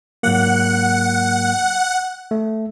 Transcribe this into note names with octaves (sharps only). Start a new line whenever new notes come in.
G#2 F#3 A#3 F#5
A3